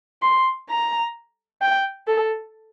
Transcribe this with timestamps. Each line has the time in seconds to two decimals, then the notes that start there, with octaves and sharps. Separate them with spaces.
0.22 C6
0.69 A#5
1.61 G5
2.07 A4